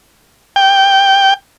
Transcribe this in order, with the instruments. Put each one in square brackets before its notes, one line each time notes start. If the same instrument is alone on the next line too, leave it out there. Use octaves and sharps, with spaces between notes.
[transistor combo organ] G5